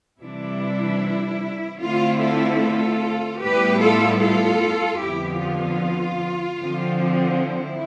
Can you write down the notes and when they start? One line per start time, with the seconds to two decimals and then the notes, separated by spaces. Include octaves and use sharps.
0.20 C3 E3 G3 D4 E4
1.80 D3 A3 C4 E4 F4
2.19 F4 A4
2.59 F4 A4
3.39 A2 G3 B3 E4 G4 B4
3.79 F4 A4
4.19 F4 A4
4.99 F2 D3 F3 B3 E4 G4
5.39 F4
6.59 D3 F3 C4
7.38 E4